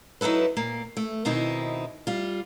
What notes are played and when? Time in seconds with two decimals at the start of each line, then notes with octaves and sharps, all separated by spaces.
0.21 F#3 D#4 E4 A4 B4
0.57 A#2 A#3
0.97 A3
1.25 B2 D#3 C4 D#4 E4
2.07 G3 F4